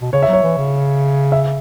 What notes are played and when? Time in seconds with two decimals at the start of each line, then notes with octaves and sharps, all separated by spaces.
0.02 B2
0.13 C#3 C#5
0.23 E5
0.28 F#3
0.33 C#5
0.43 E3
0.58 C#3
1.32 E5